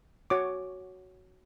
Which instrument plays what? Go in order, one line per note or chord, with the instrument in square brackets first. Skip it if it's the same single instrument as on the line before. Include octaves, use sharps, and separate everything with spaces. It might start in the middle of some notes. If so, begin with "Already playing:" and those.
[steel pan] F#4 C#5 D6